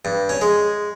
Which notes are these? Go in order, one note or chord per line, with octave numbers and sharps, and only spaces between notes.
G2
C#4
G#3